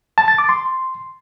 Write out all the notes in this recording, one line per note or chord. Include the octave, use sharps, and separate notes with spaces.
A5
A6
D6
C6